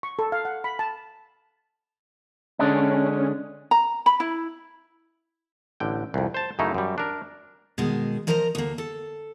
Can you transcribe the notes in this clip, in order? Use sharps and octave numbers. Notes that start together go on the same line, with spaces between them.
C#6
A4
F5
F#5
B5
A5
D3 G#3 C#4 D4
A#5
B5
E4
A1 D3 G5
C2 F2
C5 A5
F#2 C#3 A3 D#4 E4
F#2 G3
D4 A#4
B2 D#3 G#3
F3 A#4 C5 D#5 G5 A#5
D2 A#3
A4